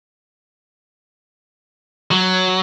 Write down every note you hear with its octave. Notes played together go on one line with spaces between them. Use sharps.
F#3